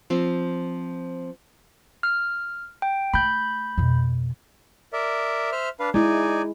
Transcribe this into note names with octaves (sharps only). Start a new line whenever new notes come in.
F3 C4
F6
G5
A3 B5 G6
F2 B2
A#4 D5 E5
C5 E5 F6
D4 B4 F5
G#3 D#4 E4 D5 G#5